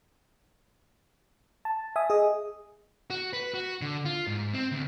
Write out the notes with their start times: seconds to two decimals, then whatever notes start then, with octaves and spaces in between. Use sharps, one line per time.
1.65 A5
1.96 E5 G#5 D#6
2.10 G#4 D#5 D#6
3.10 F#4
3.33 B4
3.54 F#4
3.81 D3
4.05 F4
4.27 G#2
4.53 C4
4.72 D2